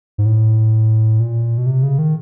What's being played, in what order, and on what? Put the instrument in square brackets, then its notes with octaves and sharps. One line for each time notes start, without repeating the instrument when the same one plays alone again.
[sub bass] G#2
A2
A#2
B2
C3
C#3
D#3